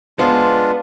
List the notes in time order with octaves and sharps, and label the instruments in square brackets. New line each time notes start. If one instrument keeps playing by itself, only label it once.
[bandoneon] G#3 D4 F4 [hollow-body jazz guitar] B3 C5